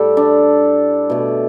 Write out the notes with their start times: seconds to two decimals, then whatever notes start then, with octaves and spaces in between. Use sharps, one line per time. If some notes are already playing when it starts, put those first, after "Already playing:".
Already playing: A2 G3 G4 A4
0.17 D4
1.10 B2 A3